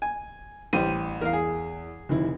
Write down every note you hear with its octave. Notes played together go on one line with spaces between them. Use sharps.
G#5
A1 G3 C5 D#7
E2 A#4 F5
G#4
F1 D#3 E4